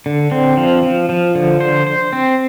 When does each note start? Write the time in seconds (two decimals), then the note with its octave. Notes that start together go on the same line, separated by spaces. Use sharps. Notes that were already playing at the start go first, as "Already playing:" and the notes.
0.06 D3
0.31 C4
0.57 F3
0.83 F3
1.09 F3
1.35 D3
1.60 C5
1.87 C5
2.13 C4